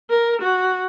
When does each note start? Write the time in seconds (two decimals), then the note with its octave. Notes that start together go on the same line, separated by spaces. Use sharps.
0.10 A#4
0.42 F#4